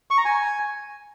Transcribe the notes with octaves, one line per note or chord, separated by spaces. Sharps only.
C#6
A#5
G#5